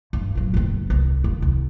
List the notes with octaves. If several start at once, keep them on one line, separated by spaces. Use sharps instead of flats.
G2
A#2 F#3
F#1 B3
C2
D#2
C2